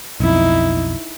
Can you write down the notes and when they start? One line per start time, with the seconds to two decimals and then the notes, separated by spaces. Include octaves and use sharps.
0.20 B1 F2 D#4 E4